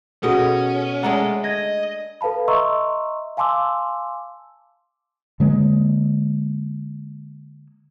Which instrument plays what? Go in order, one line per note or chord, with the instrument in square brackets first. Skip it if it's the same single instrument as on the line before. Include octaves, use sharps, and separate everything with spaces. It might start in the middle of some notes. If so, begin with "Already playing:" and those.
[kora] B2 D#5 [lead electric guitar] C#4 [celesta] F#4 G#4 A4
[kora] G#3 A3 D4 [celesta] F#5 A#5
[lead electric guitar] D#5 [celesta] G#6 A#6
[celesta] A4 B4 F5 A5 B5
D#5 E5 A#5 C6 C#6 E6
F5 G#5 A5 C6 D6 E6
[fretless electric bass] D3 G#3 A#3